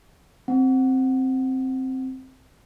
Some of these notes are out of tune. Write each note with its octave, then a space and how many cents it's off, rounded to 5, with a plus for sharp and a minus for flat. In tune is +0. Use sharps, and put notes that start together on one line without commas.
C4 +0 F#5 +0